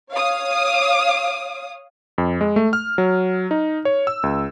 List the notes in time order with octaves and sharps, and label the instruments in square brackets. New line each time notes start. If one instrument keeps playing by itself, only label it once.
[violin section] C#5 F5 D#6
[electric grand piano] F2
G#3
A3
F6
F#3
D#4
C#5
E6
C#2